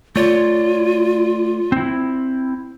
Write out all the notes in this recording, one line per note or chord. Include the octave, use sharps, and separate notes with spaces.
A3 F4 C#5 D5
C4 E4